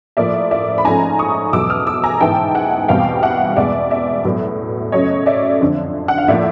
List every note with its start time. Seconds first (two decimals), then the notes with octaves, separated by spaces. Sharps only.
0.17 A2 F3 A#3 D5 E5
0.51 D5 E5
0.78 B5
0.84 G#2 F3 A3 C#4 G#5 A#5
1.19 C#6 D#6
1.53 E2 B2 F#3 A3 D6 E6
1.70 D#6 F6
1.87 D6 E6
2.04 G#5 A#5
2.20 G#2 E3 G#3 B3 G5 A5
2.55 F#5 G#5
2.88 E2 B2 G3 C4 F5 G5
3.22 E5 F#5
3.56 E2 B2 G#3 D5 E5
3.90 D5 E5
4.25 A2 F#3 B3
4.92 F#2 C#3 F#3 A3 C#5 D#5
5.26 D5 E5
5.60 F2 D3 F3
6.08 F#5
6.18 F5
6.28 A2 F3 A#3 D5 E5